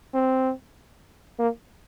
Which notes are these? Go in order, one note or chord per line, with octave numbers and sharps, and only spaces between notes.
C4
A#3